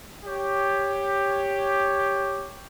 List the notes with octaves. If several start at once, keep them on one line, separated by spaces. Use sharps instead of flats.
G4 C#5